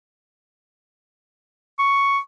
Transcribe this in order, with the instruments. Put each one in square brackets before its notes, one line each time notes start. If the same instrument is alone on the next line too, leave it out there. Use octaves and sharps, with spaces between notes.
[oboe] C#6